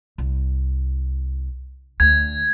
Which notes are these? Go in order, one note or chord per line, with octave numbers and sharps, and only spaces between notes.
C2
D2 G#6